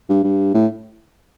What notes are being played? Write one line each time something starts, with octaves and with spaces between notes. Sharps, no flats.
G2
G2
A2